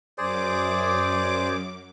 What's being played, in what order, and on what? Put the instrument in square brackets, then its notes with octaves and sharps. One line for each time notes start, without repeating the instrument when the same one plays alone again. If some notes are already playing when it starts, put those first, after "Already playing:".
[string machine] F#2 D6 [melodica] G#4 C5 D5